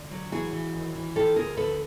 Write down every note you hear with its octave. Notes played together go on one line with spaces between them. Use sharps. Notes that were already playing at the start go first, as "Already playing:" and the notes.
Already playing: D3
F#3
E3 F#4 G#4
E3
D#2
E3
F3 G4 A4
D2 G#4 A#4
D3 A4 B4